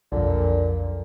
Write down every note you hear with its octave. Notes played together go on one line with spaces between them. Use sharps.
B1 F2 A#2 D3